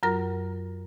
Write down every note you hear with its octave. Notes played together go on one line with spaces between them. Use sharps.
F#2 F#3 F4 A#4 A#6